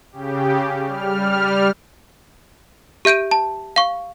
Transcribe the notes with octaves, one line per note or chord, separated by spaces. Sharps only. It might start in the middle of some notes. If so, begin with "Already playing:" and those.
C#3 G4
G3 F6
G4 E5 G6 D7 D#7
A5
F5 C#6